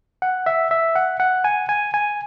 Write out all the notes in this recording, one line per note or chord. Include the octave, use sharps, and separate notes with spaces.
F#5
E5
E5
F#5
F#5
G#5
G#5
G#5